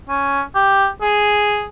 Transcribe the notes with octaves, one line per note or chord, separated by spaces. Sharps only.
C#4
G4
G#4